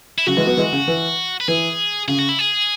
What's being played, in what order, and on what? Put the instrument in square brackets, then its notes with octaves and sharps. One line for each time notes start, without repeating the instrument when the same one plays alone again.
[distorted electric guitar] E4
[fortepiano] C#3 F#3 [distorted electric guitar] F#4
[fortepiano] E3 G#3
F#3 B3
E3 G#3
C#3
E3
[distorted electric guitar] B4
[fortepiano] E3 [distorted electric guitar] G#4
[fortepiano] C#3 [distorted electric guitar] G#4
[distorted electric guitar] F#4
E4
G#4